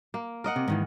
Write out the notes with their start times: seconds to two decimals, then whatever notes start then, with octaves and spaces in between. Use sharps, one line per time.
0.14 A#3
0.44 A#4 D#5 F#5
0.56 C3
0.68 G#2 D#3 E3